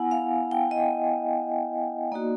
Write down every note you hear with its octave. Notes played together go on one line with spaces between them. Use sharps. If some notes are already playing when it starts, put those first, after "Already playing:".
Already playing: B3 E4 F#5 G#5
F5
G5
D#5
A#3 D#4 F#4 D5